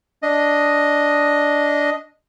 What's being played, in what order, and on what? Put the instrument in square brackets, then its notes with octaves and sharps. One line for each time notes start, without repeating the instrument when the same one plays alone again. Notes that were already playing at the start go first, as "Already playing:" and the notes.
[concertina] D4 D#5